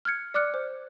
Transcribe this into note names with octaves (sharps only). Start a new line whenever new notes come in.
F6 F#6 G#6 C#7
D5 D6 F6 F#6 C#7
C5